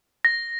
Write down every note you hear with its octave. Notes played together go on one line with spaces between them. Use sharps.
A#6